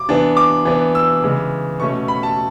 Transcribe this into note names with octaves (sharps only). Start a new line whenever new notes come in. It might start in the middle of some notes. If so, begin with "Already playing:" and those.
Already playing: D6
E3 B3 D4
D6
E3 B3 D4
E6
C#3 E3 G#3
B2 A3 C#4 C#6
B5
A5